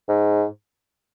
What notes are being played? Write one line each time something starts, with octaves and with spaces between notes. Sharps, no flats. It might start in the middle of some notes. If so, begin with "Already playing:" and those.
G#2